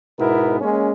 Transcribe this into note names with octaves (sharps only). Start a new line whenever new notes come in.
G#2 B2 B3 E4 A#4
G#3 A#3 C#4